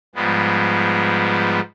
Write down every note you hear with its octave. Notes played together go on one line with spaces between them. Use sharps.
G#2 F3 G3 G#3 B3